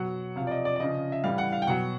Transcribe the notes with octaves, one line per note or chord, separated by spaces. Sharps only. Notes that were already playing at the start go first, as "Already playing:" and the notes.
Already playing: B2 F#3 F#5
C3 F3 F5
D5
D#5
D5
D5
C#3 F3 D#5
E5
A2 E3 G3 F5
F#5
F5
G5
B2 F#3 F#5